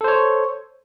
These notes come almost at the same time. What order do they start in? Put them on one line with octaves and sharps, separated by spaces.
A4 C5 C#5